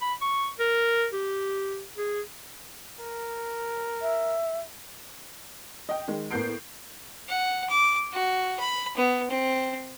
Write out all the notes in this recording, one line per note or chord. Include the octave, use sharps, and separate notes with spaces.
B5
C#6
A#4
G4
G#4
A#4
E5
D#5 G5
D#3 G#3
A2 A#3 B3 G6 C7 D7
F#5
D6
F#4
B5
B3
C4